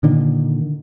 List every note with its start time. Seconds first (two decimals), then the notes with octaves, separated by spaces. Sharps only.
0.03 A#2 D3 D#3